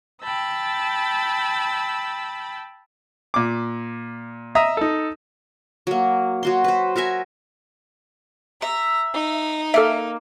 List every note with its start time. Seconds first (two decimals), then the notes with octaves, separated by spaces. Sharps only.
0.22 G5 A5 B5 E6
3.34 A#2 D6
4.55 D#5 E5 A#5 D#6
4.77 D#4 A4
5.87 F#3 A#3
6.43 F#3 F#4 C6
6.64 B4 C5
6.96 F#4 A#4 E5 G#5
8.62 E5 A#5
9.13 D#4
9.74 A#3 A4 E5 F6